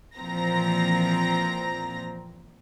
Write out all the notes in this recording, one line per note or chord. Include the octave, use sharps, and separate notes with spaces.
A#2 E3 F3 C4 A#5 A#6